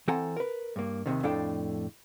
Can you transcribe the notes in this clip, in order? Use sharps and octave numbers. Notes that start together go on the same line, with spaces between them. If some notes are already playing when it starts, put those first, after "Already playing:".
E3 C4 A4 F#5 G#5 A#5
A#4 B4
G2 A#3
D#2 G#2 C3 D#3
F2 A2 D4 A4 F5 G5